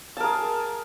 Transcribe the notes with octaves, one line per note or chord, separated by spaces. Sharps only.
G#4 A#4 A5